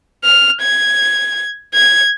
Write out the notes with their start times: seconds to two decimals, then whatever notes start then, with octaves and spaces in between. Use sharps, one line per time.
0.24 F6
0.62 G#6
1.74 G#6